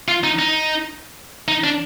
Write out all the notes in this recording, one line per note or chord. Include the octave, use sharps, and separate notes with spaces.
F4
D#4
D#4
D#4
D4